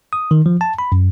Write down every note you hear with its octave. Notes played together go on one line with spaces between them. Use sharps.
D#6
D#3
F3
A5
B5
F#2